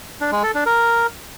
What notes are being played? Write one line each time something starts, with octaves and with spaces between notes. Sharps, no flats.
D4
G#3
A4
D4
A#4